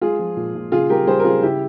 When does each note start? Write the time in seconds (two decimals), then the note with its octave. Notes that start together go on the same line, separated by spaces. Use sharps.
0.01 G#3 F4 G#4
0.19 F3
0.37 A#2
0.55 A#2
0.72 C#3 F4 G#4
0.90 G3 G4 A#4
1.07 G3 G#4 C5
1.20 A#4
1.25 C#3 F4 G#4
1.43 C#3 E4 G4